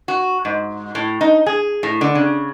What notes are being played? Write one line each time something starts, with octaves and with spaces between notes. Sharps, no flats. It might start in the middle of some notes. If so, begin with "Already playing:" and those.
F#4
G#2
A2
D#4
G#4
A2
D3
C#3